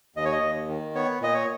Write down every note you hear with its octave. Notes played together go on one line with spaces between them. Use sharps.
D#2 D#5
C#5
D#5
D#2
D#3
B3 C#5
A#2 D#5
C#5